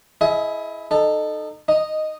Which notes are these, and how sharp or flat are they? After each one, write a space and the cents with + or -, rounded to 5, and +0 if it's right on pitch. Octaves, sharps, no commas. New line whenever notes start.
E4 +0 G#4 +35 D#5 +20
D#4 -25 A4 +0
D#4 -10 D#5 +0